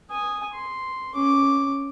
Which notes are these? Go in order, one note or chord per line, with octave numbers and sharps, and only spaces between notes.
G#5 D#6
C6
C#4 D6